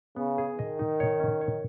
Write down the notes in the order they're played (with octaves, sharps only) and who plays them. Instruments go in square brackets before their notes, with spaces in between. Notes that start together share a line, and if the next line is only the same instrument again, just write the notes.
[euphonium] C#3 [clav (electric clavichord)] B3
[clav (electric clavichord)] G#4
[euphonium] D#3 [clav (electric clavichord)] D#5
[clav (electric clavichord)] D#4
C#5
C#4
C#5